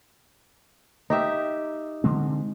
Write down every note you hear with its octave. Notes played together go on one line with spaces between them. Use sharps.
D#4 G4 E5
D3 G#3 C4